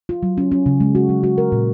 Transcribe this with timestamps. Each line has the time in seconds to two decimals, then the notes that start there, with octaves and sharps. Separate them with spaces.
0.09 F4
0.23 F#3
0.38 C#4
0.52 C#4
0.66 C#3
0.80 G#3
0.95 F#4
1.09 F#3
1.23 F#4
1.38 A#4
1.52 A#2